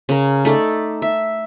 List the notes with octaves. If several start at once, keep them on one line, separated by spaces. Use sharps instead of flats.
C#3 A#4
A3 D#4 A4 D5
E5